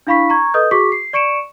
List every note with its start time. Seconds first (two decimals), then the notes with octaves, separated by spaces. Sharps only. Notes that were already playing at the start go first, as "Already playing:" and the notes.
0.07 D4 E4 F5 B5 C#6 B6
0.30 A#5 C#6 G#6
0.54 A4 B4 D#5 D#6 G6
0.71 F#4 G#4 C#6 D6 B6
0.92 C7
1.13 D5 C#6 C#7 D7 E7